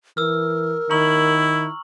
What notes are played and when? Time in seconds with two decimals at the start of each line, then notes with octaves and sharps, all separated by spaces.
0.17 E3 A#4 E6 F6
0.90 D#3 E4 A#5 C#6 F#7